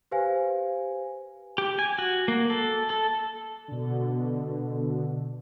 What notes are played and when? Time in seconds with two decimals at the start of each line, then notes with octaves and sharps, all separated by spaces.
0.11 G4 B4 C5 F5 G#5
1.58 G4
1.79 G#5
1.99 F#4
2.28 A#3
2.50 A4
2.90 A4
3.68 B2 D3